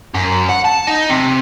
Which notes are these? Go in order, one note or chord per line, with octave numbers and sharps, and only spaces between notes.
F#2
F#5
A5
D#4
C3